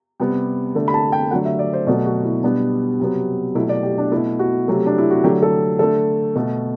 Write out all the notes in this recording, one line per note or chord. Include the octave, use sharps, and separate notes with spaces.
C3 G3 B3
D3 A3
B5
A5
G5
D3 F#3 A3 F#5
E5
D5
C5
B2 F#3 A3 D5
F#4
E4
B2 G3 B3 D4
C3 F#3 B3
B2 F#3 A3 E4
D5
G4
D4
B2 A3 E4
F#4
C3 F#3 A3
D4
E4
F#4
D3 F#3 A3 G4
A4
D3 A3 A4
B2 A3